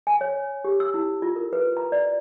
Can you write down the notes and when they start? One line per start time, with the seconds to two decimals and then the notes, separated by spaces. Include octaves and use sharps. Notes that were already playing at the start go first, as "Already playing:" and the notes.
0.07 G#5
0.21 C#5
0.64 G4
0.80 E6
0.94 E4
1.22 F4
1.36 A#4
1.53 B4
1.77 A#5
1.92 D5